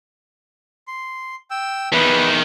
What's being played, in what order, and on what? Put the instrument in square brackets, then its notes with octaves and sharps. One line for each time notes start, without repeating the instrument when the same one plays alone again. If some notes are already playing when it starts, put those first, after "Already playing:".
[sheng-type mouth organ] C6
G5 E6
[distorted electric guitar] E2 D#3 [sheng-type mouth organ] B4